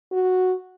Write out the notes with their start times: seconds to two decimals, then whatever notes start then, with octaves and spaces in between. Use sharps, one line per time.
0.12 F#4